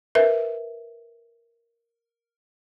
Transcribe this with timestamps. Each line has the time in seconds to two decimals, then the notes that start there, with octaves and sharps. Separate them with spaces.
0.15 A#4 B4 E5